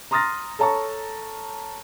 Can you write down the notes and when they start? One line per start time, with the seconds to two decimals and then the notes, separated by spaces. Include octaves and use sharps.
0.11 A#5 C6 D#6 F6 A6 A#6
0.59 A4 C#5 A5 A#5 C#6